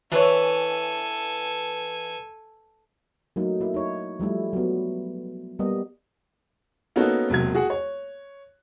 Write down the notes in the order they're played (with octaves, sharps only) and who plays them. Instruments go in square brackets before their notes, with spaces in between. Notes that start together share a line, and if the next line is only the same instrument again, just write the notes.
[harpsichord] E3 [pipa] D4 C#5 [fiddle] A4 G#5
[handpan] F#3 A3 A#3 D#4
A#3 E4
D#4 C#5
F3 G3 A3 E4
F#3 B3
G3 A#3 B3 D#5
[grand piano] A#3 B3 C#4 D#4 F#4 A4
E1 C3 F#3 A#3 G#6
F#4 G#4 F#5 G#5
C#5